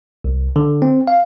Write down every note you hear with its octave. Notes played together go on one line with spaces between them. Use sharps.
C2
D3
C4
F5